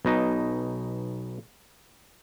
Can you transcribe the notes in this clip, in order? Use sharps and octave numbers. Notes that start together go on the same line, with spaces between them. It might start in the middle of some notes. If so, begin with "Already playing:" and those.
B1 B2 D#4